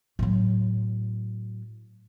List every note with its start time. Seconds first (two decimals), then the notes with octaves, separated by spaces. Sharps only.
0.19 A2 F#3